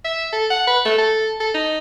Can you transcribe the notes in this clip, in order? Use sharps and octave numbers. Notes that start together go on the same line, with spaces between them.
E5
A4
F#5
B4
A3
A4
A4
D#4